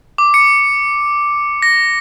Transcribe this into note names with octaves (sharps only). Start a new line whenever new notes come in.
D6
C#7
A#6